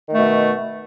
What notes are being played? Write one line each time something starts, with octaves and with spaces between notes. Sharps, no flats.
B2 D#3 A3